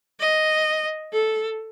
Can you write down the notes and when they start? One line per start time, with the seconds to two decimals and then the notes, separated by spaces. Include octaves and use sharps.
0.20 D#5
1.13 A4